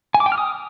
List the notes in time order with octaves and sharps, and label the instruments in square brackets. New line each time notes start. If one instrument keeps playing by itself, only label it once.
[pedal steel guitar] G#5
D6
G5
F6
D#6